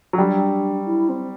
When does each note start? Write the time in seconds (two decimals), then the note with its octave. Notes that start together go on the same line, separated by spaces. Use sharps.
0.13 F#3
0.18 G3 D4
0.86 E4
1.09 C4